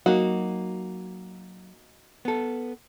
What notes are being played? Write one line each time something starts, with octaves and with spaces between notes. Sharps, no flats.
F#3 A#3 D#4 F#4
B3 A4